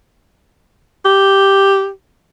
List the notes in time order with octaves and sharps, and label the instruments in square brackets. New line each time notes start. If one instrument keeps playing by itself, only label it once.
[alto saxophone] G4